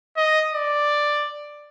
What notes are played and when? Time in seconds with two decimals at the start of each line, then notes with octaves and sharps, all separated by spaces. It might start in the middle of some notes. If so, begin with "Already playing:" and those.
0.17 D#5
0.54 D5